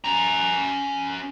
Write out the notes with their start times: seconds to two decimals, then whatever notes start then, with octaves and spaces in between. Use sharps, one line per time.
0.05 C#4 A#5